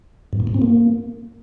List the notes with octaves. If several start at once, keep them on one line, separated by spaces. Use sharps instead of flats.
G2
A2
G#2
C4
A#3